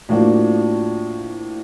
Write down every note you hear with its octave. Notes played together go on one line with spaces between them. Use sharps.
A2 F3 A#3 D4 F#4